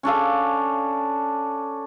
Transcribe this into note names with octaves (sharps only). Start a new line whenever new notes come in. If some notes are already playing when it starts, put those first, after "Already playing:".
C#4 D4 A4 F5